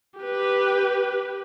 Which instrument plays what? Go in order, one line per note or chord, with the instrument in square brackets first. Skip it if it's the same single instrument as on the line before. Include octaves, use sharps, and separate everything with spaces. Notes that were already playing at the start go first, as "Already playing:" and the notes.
[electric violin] G4 B4